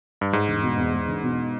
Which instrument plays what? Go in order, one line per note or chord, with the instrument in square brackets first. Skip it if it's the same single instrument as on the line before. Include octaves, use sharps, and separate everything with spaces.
[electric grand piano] G2
[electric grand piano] G#2 [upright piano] G#3
[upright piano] E1
B2
E2
G#3
E1
B2